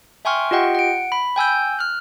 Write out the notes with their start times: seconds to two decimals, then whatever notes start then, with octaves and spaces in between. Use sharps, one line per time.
0.25 E5 G5 G#5 C6 C#6 F6
0.51 F4 G4 D#5 F#5 G5
0.75 F#5 D7
1.12 B5
1.36 G5 G#5 E6 G6
1.79 F6 F#6